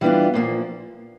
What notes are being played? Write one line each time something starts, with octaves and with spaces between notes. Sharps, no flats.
E3 G3 B3 D4 F4
A#2 F3 A#3